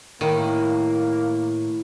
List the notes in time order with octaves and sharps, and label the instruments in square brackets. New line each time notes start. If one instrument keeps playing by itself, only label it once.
[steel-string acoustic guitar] A2 [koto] D#3 [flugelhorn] A#3